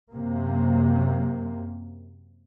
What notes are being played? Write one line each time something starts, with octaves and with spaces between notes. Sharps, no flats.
F#2 C3 A#3